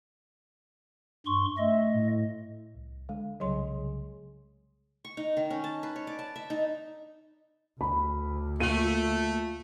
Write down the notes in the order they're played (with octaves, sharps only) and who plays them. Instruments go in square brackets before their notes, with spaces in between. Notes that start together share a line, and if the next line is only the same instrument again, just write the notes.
[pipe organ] G2 C6 C#6
[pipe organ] A3 D#5 [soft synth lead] E5
[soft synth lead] A2
[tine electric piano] C2
[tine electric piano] D3 [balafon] G#3
[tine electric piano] C2 C#3 G#4 [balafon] F#3 C#5 C6
[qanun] C#6
D#4
D#3
C#4
A5
B4
C#5
D5
A5
E5
D#4
[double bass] D2 [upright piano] B5
[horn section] A3 [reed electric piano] A#3 F4 [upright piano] D#7